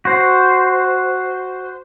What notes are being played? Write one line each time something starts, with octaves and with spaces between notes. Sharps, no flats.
F#4 C5